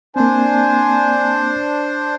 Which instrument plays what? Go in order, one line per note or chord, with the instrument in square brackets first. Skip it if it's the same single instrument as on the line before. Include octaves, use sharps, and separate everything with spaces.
[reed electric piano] A#3 C4 [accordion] D4 C5 [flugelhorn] G#5